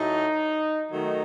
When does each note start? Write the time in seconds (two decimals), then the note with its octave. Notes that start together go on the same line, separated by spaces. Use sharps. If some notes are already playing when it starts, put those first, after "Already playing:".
Already playing: A2 F#3 A3 D#4
0.92 D#3 F#3 A3 D#4